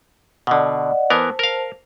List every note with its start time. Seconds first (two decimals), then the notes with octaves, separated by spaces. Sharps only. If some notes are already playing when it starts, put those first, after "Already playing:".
0.47 B2 D3 D5 D#5 F#5
1.10 E3 B3 A#4 C5 A5
1.39 A#4 F5